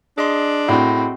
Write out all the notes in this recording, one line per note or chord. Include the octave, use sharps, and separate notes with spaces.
D4 G#4 D#5 C6
A2 C4 F#4